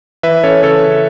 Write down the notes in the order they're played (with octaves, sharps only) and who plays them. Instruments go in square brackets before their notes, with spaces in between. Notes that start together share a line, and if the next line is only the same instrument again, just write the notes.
[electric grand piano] E3 B4 E5
C#4 A4 C#5
C#3 A4 C#5
C#3